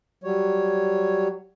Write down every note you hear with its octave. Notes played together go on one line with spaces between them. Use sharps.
F#3 G3 C#5